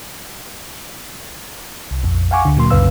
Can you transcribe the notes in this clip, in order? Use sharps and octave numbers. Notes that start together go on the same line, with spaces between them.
C2
A#1 F2
F5 F#5 G#5 C#6 D6
D2 D3
A#2 F#3 A#3 C6
C2 F#2 C#3 B4 F5 E6